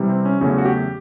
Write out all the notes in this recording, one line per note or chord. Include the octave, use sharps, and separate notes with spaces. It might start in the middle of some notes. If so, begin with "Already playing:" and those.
Already playing: C3 E3 G3
C4
C#4
E2 C#3 F#3 A3 C#4
F#4
G4